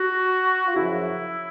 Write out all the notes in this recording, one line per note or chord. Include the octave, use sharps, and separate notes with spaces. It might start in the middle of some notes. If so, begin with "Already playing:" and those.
Already playing: F#4
F4
F#2 C#3 F3 E4